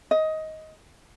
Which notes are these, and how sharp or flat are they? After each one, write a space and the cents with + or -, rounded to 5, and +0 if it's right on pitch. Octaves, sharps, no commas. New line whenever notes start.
D#5 +15